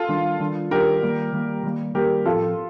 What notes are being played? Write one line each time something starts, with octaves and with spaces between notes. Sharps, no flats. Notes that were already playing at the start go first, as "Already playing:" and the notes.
Already playing: F4 A4
D#3 G3 D4
D#3 G3 D4
D#3 G3 D4 G4 A#4
D#3 G3 A#3
D#3 G3 A#3
D#3 G3 A#3
D#3 G3 A#3 G4 A#4
A2 F3 C4 F4 A4